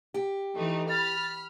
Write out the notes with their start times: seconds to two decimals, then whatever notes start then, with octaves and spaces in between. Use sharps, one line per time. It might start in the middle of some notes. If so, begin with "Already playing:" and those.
0.14 G4
0.56 E3 A3 D#4
0.89 B5 F6 A6